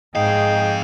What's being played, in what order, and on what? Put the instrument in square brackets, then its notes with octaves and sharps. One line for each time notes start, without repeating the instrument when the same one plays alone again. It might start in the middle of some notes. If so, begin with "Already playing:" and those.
[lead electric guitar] F2 F5 [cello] G#2 G#4 [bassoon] D#4 [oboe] G5